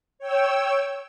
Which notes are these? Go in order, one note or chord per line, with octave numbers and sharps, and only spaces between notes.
C#5 G5 E6